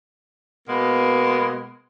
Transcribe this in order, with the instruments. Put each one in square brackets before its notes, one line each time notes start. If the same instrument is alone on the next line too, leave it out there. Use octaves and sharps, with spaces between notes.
[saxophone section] B2 G#3 A#3 B3